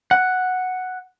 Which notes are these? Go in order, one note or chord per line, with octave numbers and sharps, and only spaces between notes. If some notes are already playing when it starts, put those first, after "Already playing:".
F#5